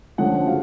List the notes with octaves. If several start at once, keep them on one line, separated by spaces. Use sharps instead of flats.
D3 F3 A3 C#4 F#5
C#3 F#3 F5